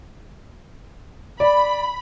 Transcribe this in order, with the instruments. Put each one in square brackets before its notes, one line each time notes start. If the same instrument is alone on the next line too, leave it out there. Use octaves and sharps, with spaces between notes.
[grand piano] D5 [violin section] B5